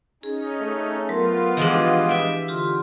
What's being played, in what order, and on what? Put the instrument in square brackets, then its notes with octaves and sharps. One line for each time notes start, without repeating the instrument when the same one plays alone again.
[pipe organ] C#4 D#4 [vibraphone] G#4
[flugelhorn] A3
[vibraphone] F#3 A#4 C6 [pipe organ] B3 F4
[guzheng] E3 F3 G#3 [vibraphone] D4 G4 [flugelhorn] D#5
[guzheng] E5 G5
[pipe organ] D3 [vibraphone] F4 G4 C6